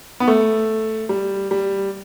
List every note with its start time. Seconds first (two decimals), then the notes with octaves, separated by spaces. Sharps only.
0.20 B3
0.28 A3
1.09 G3
1.51 G3